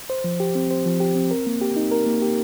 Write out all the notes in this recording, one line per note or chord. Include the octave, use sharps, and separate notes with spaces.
C5
F3
G4
C4
C5
F3
G4
C4
A#4
A#3
G4
D#4
A#4
A#3
G4